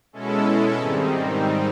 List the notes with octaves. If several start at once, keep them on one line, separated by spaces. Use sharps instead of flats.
B2 G#3 C#4 E4 A4
G#2 D#3 G3 C4 D#4